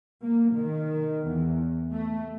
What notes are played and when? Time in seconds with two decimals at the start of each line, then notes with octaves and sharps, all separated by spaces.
0.23 A#3
0.54 D#3
1.29 E2
1.91 A3